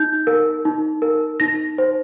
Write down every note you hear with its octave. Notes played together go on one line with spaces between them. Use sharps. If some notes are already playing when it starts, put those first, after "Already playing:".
Already playing: D#4 G6
A#4
D#4
A#4
D#4 A#6
C5